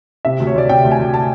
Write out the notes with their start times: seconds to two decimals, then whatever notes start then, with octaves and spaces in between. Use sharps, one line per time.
0.25 C3 E5
0.40 D2
0.47 C#5
0.55 D2 D5
0.69 C3 G5
0.85 D2
0.92 G#5
0.99 D2
1.14 A5